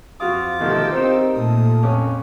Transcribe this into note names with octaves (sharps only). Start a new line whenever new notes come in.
F2 F4 F#4 F5 D6 D#6
B2 D3 D#3 F3 A3 G4 G5 E6
C4 D#4 F4 A#4 C5
A#2 A3 A4 D#6
F2 C#4 D6